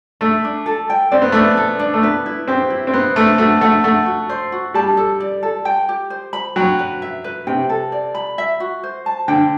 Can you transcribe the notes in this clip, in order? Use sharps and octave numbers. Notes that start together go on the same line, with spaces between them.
A3 E5
D4
A4
G5
C4 D5
B3
A3 D4
B3
A4
D4
A3
B3 B4
E4
C4 G4
E4
C4
B3 C5
A3 D4
A3 F#4
A3 F#5
A3 F#5
F#4
C5
F#4
G3 A5
A4
D5
A4
G5
G4
C5
B5
F#3 G5
B4
E5
B4
C3 G5
A4
D5
B5
E5
F#4
C5
A5
D3 G5